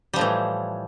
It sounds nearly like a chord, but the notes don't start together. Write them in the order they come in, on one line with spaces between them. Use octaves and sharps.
G3 F3 A2 E3